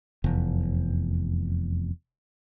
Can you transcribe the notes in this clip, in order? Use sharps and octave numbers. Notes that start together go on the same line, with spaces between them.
F1 E2